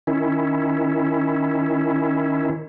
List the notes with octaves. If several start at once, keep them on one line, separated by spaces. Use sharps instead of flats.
D#3 C#4 E4